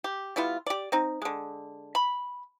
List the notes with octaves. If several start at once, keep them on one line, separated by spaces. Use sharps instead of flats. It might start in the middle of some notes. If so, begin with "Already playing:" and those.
G4
G3 B3 E4 F4
G4 D5
C4 D#4
D3 G#3
B5